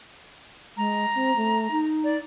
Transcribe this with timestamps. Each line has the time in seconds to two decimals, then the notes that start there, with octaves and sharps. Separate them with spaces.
0.77 G#3 A#5
1.15 C4
1.36 A3
1.71 D#4
2.04 D5